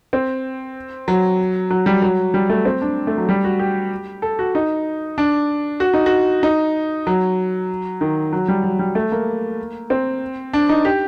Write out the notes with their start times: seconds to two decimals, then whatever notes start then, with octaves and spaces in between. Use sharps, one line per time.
0.13 C4
1.08 F#3
1.70 F#3
1.86 G3
2.02 F#3
2.34 G3
2.49 A3
2.65 C4
2.82 D4
3.07 A3
3.18 F#3
3.29 G3
3.44 F#4
3.59 G4
4.22 A4
4.39 F#4
4.55 D#4
5.18 D4
5.80 F#4
5.94 D#4
6.06 F#4
6.43 D#4
7.07 F#3
8.01 D#3
8.33 F#3
8.48 G3
8.64 F#3
8.79 G3
8.95 A3
9.12 A#3
9.90 C4
10.53 D4
10.69 D#4
10.85 G4